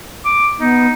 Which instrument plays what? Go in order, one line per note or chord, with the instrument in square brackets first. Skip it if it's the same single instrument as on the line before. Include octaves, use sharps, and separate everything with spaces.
[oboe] D6
[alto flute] B3 [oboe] D#4